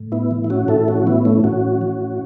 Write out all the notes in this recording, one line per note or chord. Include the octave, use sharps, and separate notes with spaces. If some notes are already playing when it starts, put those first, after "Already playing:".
Already playing: A2
B3 E4
E3
E4
C#4 F#4
A2 E4 A4
C#4 F#4
E3 B3 E4
A3 C#4
A2 C#4 F#4
E3